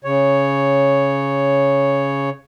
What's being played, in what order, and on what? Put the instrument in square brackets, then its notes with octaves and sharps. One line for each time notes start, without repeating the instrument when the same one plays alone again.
[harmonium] C#3 C#5